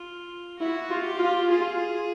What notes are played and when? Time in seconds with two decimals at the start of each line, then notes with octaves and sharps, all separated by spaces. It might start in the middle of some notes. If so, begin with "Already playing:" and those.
Already playing: F4
0.59 E4 F#4
0.90 F4
1.05 G4
1.19 F4
1.49 F4 G#4